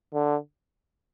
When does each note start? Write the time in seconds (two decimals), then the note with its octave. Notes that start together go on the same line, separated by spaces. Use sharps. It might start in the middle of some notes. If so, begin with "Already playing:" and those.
0.14 D3